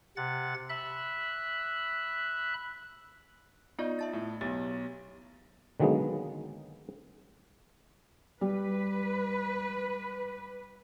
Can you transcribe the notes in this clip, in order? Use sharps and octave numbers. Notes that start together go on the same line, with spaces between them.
C3 F#5 A6
E5 B5 F#6
B3 D#4 F4 D5
E5 A5 A6
A2
B1 G4 A6
D3 D#3 F#3 G#3 A#3 B3
G3 B4